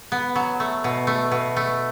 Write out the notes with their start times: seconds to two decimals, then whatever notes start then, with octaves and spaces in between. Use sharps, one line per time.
0.12 B3
0.36 F#3
0.60 A3
0.84 B2
1.07 A3
1.31 B2
1.57 A3